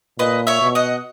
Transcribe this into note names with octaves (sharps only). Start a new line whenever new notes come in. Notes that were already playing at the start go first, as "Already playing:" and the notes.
A#2 B4 D#5
C#5 E5
B2
D#5 F#5